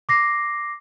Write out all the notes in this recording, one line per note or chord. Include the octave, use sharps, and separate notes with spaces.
D6 A#6 C7